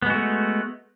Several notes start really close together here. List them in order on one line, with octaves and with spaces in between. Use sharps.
B3 G#3 F#4 A3